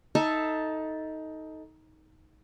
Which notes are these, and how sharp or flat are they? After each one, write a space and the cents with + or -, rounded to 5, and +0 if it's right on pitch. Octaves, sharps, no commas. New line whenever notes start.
D#4 +15 A4 +0 E5 +15